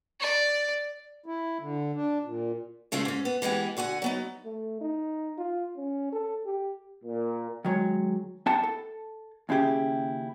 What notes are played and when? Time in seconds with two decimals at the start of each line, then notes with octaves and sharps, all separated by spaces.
0.20 D5
1.26 E4
1.60 D3
1.95 D4
2.23 A#2
2.92 C#3 G#3 A3 C#4 F4
3.05 G#2 C#4
3.25 B3
3.42 E3 G#3 B3 G4
3.77 D3 F#4 F#5 G#5
4.02 F#3 B3 D#4
4.45 A3
4.81 D#4
5.38 F4
5.77 C#4
6.13 A4
6.46 G4
7.04 A#2
7.65 D#3 F#3 G#3 C#5
8.46 B3 E4 G4 F#5 G5 A5
8.63 A4
9.49 D#2 C#3 E4 G4 G#4